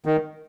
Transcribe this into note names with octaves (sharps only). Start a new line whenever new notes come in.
D#3